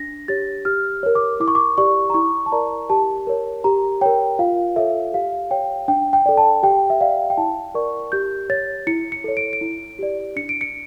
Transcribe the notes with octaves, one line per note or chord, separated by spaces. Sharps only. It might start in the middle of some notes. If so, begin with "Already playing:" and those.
Already playing: D4 A#6
G4 C#5 A6
G4 F6
A#4 C#5
D6
E4 D6
C#6
D6
G4 D5 C#6
A#5
E4 C#6
A5
A#4 D5 A#5
G4 A5
A#4 C#5
G4 A#5
A#4 C#5 G5
F4 F5
A4 C#5 E5
G4 F5
C#5 G5
D4 G5
G5
A4 D5
A5
G4 G5
E5
D5 F5
G5
E4 A5
A#4 D5 C#6
G4 G6
C#5 A6
E4 C#7
C#7
A4 C#5
D7
D7
E4
G4 D5
D4 C#7
D7
C#7